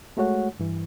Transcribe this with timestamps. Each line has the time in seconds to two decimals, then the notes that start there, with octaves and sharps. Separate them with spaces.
0.17 G#3 A3 F#4 C#5 F#5
0.60 G2 E3